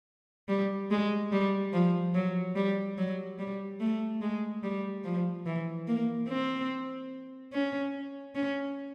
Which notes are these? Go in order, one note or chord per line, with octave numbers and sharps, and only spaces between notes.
G3
G#3
G3
F3
F#3
G3
F#3
G3
A3
G#3
G3
F3
E3
A#3
C4
C#4
C#4